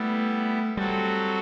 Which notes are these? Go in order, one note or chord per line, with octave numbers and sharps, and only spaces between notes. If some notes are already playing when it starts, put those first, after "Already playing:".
Already playing: G3 A3 B3 E4
F#3 G3 C4 F#4 A4